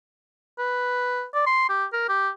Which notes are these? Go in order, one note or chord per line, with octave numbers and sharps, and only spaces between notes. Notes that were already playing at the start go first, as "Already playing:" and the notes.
B4
D5
C6
G4
A#4
G4